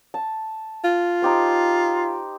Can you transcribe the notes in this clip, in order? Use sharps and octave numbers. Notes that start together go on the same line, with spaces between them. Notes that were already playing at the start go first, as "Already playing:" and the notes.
A5
F4
D#4 G4 C5